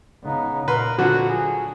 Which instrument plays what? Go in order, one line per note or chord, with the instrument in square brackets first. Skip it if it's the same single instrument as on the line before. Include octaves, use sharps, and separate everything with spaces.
[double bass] C#3 D#4 [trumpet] B3
[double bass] A#2 [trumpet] A#4 [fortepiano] B4 C6
[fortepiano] D3 F3 F#3 [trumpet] F#4
[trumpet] G#4